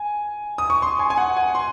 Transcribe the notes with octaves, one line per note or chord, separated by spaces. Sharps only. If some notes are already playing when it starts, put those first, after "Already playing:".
Already playing: G#5
D#6
C#6
C6
G#5
G#5
F#5
G#5
C6